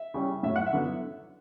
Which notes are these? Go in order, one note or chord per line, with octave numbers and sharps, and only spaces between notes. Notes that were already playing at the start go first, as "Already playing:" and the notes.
Already playing: E5
C#3 G3 C#4 E4
A2 F#3 C#4 E5
F#5
E5
D3 F#3 B3 E4